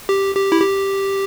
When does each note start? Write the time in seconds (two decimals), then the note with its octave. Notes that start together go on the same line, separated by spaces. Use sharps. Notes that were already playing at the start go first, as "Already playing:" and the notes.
0.09 G4
0.35 G4
0.52 E4
0.61 G4